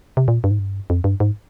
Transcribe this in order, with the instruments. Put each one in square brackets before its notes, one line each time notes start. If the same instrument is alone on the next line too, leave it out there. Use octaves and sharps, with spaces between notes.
[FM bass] C3
A#2
G2
G#2
G2
F2
G2
G#2